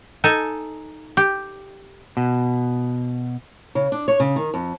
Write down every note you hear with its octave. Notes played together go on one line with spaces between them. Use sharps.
D#4 A4 G#5
G4
B2
C#3
D4
C#5
C#3
D#3
F2